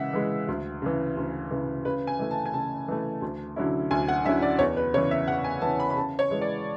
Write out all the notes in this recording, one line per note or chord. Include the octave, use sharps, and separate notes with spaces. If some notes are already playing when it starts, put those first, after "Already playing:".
Already playing: C#3 E3 G#3 E5 F#5
E3 G#3
D2
C#3 E3
D2
C#3 E3
C#3 B4
G#5
E3 A3
A5
G#5
C#3 A5
E3 A3
D2
D3 F#3 C#4 E4
D2 G#5
F#5
D3 F#3 C#4 E4 E5
D5
E2 C#5
B4
C#3 E3 C#5
E5
E2 F#5
G#5
C#3 E3 A5
B5
B5
C#3 A5
C#5
E3 G#3
D5